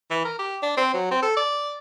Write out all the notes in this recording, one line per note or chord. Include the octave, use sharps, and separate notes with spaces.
E3
A#4
G4
D4
C4
F#3
C4
A4
D5